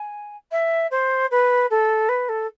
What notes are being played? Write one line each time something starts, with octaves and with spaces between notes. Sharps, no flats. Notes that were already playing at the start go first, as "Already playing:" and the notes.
Already playing: G#5
E5
C5
B4
A4
B4
A4